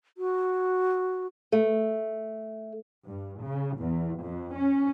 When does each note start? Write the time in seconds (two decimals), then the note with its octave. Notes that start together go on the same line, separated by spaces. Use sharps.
0.18 F#4
1.52 A3
3.06 G2
3.44 C#3
3.79 E2
4.23 F2
4.58 C#4